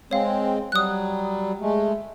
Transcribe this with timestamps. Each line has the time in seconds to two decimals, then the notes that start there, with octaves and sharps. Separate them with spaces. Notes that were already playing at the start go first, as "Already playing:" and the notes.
0.11 G#3 C4 C#5 F5
0.72 F#3 G3 D#6 F#6
1.60 G#3 A3